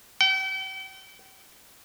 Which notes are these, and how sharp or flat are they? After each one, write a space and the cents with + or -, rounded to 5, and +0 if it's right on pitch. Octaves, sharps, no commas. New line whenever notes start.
G5 -40